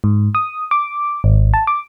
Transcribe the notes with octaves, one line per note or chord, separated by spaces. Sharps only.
G#2
D#6
D6
G#1
A5
D6